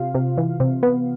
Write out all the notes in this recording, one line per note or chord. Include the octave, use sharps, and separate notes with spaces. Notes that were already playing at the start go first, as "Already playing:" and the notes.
Already playing: C3 F4 F5
C3
E3
C3
B3